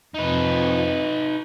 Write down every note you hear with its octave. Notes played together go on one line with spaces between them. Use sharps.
F2 D#4 B4